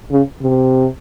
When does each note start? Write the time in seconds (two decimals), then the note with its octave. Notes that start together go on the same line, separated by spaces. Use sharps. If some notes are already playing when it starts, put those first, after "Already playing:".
0.12 C#3
0.42 C3